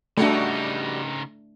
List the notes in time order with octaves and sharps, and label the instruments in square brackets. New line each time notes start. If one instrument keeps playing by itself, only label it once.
[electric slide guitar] C#3 D#4 [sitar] G3 F#4 [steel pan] A3 D4